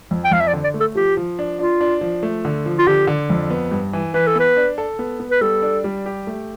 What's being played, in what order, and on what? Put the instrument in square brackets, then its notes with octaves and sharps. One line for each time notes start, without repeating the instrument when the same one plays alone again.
[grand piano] F2
[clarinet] G5
[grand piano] F2 [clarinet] F5
[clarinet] E5
D5
[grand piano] D3
[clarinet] D5
[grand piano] A3
[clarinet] A4
[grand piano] F3 [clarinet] G4
[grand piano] F3
D4
[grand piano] D4 [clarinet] F4
[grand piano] D4
F3
A3
D3
F3
[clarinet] F4
[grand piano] D3 [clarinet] G4
[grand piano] D3
F2
B3
G2
E3
[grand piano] E3 [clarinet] B4
[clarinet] A4
[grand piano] B3 [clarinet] B4
[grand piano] D4
A4
B3
B3
[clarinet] B4
[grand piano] G3 [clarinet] A4
[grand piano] D4
G3
G4
A3